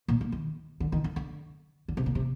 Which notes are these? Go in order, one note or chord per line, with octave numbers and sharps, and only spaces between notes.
A#2
D3
D#3
D3
D#3
D3
D3
D3
C3
A#2
C3